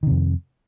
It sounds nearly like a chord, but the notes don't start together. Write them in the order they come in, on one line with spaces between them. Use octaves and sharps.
D#3 C3 F2